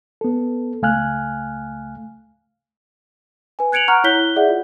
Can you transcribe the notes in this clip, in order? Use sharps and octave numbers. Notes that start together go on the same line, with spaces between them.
B3 A4
C#2 A3 F5 G#5 F6 F#6
B4 G#5
F#6 G#6 C#7 D7 F7 F#7
F#5 A#5 C#6 F6 F#6
E4 C#5 F#6 G6 B6 G7
G#4 D5 E5 F#5
F4